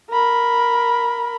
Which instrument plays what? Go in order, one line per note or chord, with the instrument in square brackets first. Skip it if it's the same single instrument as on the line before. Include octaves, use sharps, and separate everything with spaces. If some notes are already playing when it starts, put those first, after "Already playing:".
[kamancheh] A#4 B5